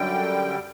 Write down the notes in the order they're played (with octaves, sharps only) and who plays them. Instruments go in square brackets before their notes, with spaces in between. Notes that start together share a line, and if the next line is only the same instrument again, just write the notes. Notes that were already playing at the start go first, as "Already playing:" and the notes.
Already playing: [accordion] F#2 D3 G3 G5